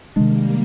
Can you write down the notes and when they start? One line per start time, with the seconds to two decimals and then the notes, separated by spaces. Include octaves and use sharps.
0.16 C3 D#3 G3 G#3 A#3 D4